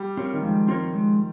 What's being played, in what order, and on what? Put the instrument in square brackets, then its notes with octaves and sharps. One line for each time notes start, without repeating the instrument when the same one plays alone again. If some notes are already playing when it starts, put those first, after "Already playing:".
Already playing: [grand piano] G3
[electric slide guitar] C4 F4 A#4 C#5
[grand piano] D#3
[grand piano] F3 [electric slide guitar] G#3
[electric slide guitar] C4 F4 A#4 C#5
G#3